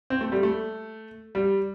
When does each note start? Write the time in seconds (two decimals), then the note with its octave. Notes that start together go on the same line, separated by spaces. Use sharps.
0.10 C4
0.21 A3
0.32 G3
0.43 A3
1.35 G3